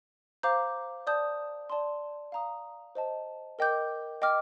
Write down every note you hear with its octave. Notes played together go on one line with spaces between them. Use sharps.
C5 F5 A#5 D6 G6
D5 A5 D#6 G6
D5 A5 C6
F5 A#5 D#6
C5 D#5 A5
A#4 D#5 G5 D6 G6
D#5 G5 D6 F6